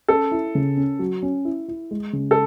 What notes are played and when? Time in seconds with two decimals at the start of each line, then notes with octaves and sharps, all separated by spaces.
0.09 C#4 A4
0.32 E4
0.55 C#3
0.77 C#4
0.99 F#3
1.23 C#4
1.45 E4
1.68 E4
1.91 G#3
2.13 C#3
2.31 A4